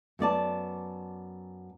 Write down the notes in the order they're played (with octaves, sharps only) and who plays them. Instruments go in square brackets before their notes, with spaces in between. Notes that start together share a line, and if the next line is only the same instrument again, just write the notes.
[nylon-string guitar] F#2 B3 D5 A5